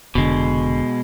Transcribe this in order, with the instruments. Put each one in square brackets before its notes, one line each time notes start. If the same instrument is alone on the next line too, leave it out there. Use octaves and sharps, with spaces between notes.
[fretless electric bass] F1 D3 [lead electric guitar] B2 G#3